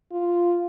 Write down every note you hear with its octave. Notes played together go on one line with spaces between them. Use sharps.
F4